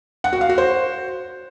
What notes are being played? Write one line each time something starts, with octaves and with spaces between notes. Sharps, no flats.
F#5
F#4
F5
F#4
C5